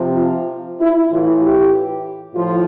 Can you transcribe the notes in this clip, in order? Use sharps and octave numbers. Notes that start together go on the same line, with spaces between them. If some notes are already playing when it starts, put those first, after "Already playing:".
Already playing: C3 F3
F4
E4
A2 E3 F4
G4
A2 F3 F4